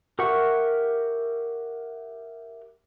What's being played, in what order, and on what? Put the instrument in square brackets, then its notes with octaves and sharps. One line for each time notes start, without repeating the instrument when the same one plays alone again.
[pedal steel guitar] G4 A#4 E5 F#5 C#6